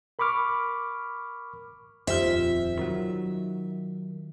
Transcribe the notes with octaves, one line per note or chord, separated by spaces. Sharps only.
A#4 B5 C#6 D6 F6
D#1 F2 C4 F4 G4 C5 E5
D#3 F#3